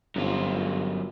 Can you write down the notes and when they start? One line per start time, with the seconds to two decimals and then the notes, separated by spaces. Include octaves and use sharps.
0.16 G1 F#2 F4